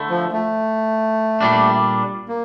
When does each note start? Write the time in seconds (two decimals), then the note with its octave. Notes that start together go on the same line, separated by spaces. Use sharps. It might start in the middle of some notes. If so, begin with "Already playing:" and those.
Already playing: D3 A3 E4
0.10 F3
0.32 A3
1.41 A#2 G3 D4
2.28 A#3